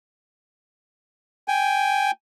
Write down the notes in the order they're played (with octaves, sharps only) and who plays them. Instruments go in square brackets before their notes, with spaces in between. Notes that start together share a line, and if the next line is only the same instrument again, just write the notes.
[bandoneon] G5 G#5